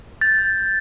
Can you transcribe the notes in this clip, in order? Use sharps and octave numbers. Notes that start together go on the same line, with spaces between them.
G6 A6
G6
G6